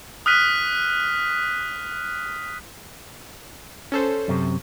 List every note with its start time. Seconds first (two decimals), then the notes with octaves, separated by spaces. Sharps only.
0.26 D#6 F6 F#6 B6 D#7
3.92 C#4 A4 C5
4.28 F#2 C3